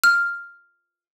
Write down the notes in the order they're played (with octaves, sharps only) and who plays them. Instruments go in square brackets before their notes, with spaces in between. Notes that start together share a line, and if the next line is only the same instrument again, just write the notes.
[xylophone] F6